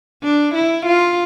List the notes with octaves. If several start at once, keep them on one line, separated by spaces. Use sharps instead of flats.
D4
E4
F4